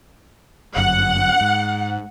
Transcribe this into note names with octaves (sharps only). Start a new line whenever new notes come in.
G1 F#2 F#5
G#2